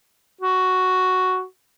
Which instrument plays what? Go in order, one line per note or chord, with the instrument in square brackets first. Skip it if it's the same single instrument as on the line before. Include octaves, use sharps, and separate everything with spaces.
[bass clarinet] F#4